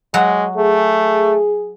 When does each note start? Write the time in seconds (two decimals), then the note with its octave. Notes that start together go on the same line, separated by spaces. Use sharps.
0.14 F#3 G#3 F#4 F#5
0.57 A3 G#4